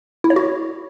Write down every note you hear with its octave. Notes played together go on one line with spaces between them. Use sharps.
E4
C#5
F#4